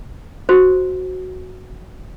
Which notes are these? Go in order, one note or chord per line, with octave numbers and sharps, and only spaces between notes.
F#4 C5